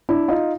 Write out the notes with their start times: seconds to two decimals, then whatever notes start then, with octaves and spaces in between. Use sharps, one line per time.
0.09 D4 E4
0.28 D#4 F4